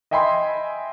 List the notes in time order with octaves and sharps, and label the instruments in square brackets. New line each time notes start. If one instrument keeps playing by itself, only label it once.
[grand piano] D#5 E5 G5 G#5 B5 C6